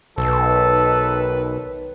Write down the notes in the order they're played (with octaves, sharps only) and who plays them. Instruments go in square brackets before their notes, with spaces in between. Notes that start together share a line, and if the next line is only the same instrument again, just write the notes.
[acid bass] B1 [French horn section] D#3 B4 [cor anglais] A4